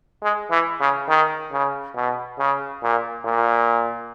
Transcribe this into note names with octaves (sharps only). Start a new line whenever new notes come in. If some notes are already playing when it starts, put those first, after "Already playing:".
G#3
E3
C#3
D#3
C#3
B2
C#3
A#2
A#2